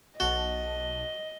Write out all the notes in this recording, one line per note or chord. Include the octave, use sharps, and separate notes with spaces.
B1 F#4 D#5 A5 G7